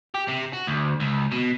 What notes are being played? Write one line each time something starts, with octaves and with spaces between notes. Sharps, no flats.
G4
C3
F#4
D2
C#2
B2